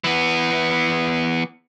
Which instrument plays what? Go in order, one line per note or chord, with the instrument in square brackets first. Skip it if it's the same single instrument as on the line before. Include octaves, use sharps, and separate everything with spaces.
[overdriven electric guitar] E3 B3